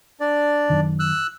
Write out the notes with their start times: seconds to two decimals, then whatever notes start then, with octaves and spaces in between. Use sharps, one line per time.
0.20 D4 D5
0.70 F#2 D#3
0.99 E6 F#6